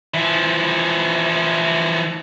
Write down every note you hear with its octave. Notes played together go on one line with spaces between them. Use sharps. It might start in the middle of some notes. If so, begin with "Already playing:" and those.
E3 F3